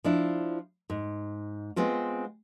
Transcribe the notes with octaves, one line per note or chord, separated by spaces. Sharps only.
F3 D4 E4
G#2
G#3 B3 C4 F4